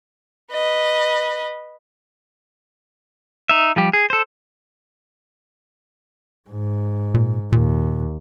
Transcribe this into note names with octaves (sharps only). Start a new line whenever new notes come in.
B4 D#5
D#4 E5
F3 G3 G4
G#4
A4 C5
G#2
A#2
D#2 A#2